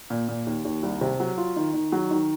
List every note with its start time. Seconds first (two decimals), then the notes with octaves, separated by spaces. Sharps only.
0.10 A#2
0.28 A#2
0.47 D#2
0.65 D#2
0.83 C2
1.01 C3
1.20 F#3
1.37 F4
1.56 D#3
1.74 D#3
1.92 F#3
2.11 D#3